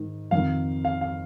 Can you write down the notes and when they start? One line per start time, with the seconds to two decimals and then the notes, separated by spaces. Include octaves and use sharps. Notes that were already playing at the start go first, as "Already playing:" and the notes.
Already playing: G#2 D#3
0.31 F2 D#3 F5
0.85 F5
1.01 F5